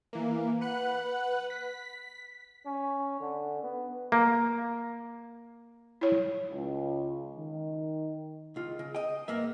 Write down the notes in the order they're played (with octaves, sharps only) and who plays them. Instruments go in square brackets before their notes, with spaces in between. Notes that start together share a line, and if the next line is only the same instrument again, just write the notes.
[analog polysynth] E3 A#3
B4 F#5 F#6
B6
[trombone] C#4
D3
B3
[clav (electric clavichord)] A#3
[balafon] E4 C#5
[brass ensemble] C#2
D#3
[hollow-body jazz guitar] C#2 F4
C#3
D#5 G5
G#2 A#3 B3 E5